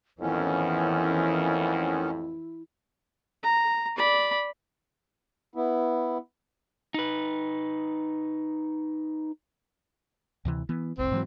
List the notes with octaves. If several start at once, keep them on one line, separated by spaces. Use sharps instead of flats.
A1 F2 D#3 E3 B3 C#4 E4
A#5
D5 B5
B3 E4
D#4 B4
D2 C3 E3
E3 B3
F1 C2 C4
G#2 E3 F#3